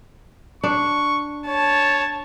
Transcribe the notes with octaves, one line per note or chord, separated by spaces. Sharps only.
D4 C#6
C#5 A5